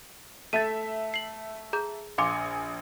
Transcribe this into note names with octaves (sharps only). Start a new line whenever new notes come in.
A3 E5 A6 D#7
C7 F#7
G#4 A#5 G6
A#1 F5 G#5 C6 D6 C#7